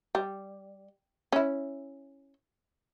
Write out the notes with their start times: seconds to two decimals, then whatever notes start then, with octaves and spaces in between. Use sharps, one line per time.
0.15 G3
1.32 C#4 E4